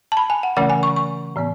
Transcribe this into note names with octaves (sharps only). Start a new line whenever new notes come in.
A5
B5
G#5
F#5
C#3 E3 A3 C#4 F#5
G#5
C#6
C#6
A2 E3 B3